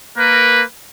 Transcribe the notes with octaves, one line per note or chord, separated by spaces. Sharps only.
A#3 A#4 B4